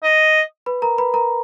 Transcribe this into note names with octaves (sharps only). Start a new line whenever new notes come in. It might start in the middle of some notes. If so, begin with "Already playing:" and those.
D#5
B4 B5
A#4 A#5
B4 B5
A#4 A#5